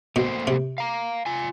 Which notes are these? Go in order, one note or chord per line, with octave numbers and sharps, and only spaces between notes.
B2 A3 A#3 C5
C3
F5 A#5
F4 G#5